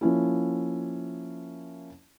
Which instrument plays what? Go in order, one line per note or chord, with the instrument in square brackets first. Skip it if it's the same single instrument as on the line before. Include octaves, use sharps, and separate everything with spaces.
[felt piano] F3 A#3 C#4 E4